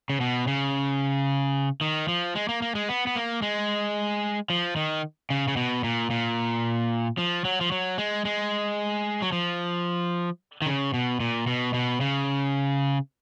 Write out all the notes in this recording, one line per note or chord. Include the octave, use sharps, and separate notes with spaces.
C#3
B2
C#3
D#3
F3
G#3
A#3
A#3
G#3
B3
B3
A#3
G#3
F3
D#3
C#3
C#3
B2
A#2
A#2
F3
F#3
F3
F#3
G#3
G#3
F#3
F3
D#3
C#3
B2
A#2
B2
B2
C#3